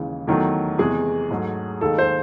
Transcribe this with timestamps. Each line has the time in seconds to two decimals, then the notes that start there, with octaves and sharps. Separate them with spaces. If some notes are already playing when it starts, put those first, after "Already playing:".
Already playing: D#2 C#3 E3 G#3
0.27 E2 D#3 F#3 A3
0.78 E2 C3 E3 G#3 G#4
1.30 G#2 F#3 A3
1.81 D#2 D#3 G#3 A4
1.98 C5